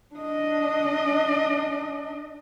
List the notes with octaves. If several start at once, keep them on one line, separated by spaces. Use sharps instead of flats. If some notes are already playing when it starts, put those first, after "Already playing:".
D4 D#5